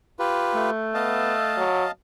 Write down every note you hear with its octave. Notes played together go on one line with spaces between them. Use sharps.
F4 G4 B4
A3
B3 D#5 F5 A5
F#3